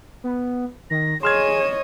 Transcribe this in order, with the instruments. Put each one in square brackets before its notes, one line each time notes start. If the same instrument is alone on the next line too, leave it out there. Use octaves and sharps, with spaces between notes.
[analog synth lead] B3
[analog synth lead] D#3 [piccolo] A#6
[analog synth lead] G#4 [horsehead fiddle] C#5 D#5 [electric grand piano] C6 F6 G#6 [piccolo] E7